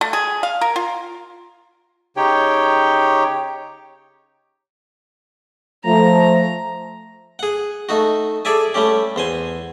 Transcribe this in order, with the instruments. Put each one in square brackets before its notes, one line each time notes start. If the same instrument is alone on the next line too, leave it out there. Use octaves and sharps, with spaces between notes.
[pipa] A3
G#4
F5
A#4
F4
[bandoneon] C#3 D#4 G4 C#5 G5
[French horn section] F3 A3 [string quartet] A#5
[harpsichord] G#4 F#5
A3 D#4 F#4
G#4 A4 D5 E5 G#5
G3 A3 C#4 G4
E2 C5 G#5